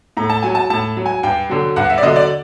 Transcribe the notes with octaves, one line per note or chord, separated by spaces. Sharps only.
A2 A#5
A5
F#3 G#5
A5
A2 A5
F#3
G#5
G2 G5
D3 F#3
G2 F#5
E5
D5
D3 F#3 D#5
D5